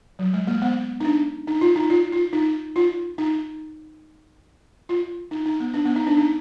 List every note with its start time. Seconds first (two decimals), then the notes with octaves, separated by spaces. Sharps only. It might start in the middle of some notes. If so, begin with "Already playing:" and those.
0.19 F#3
0.34 G#3
0.47 A#3
0.62 B3
1.00 D#4
1.05 D4
1.47 D#4
1.61 F4
1.76 D#4
1.90 F4
2.12 F4
2.33 D#4
2.76 F4
3.18 D#4
4.89 F4
5.31 D#4
5.46 D#4
5.60 B3
5.74 D4
5.85 B3
5.96 D#4
6.07 D4
6.17 D#4